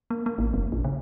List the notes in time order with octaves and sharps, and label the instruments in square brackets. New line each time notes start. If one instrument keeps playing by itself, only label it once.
[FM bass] A#3
A#3
A1
F#1
A#1
C#3